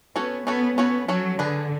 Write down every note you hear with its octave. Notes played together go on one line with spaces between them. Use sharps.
B3 C#4 F#4 A4 C#5
B3 C#4 F#4 A4 C#5
B3 C#4 F#4 A4 C#5
F#3 C#4 F#4 A4 C#5
D3 D4 G#4 B4